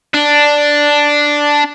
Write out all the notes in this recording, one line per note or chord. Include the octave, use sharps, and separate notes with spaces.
D4